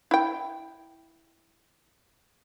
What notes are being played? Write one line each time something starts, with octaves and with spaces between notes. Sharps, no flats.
E4 G5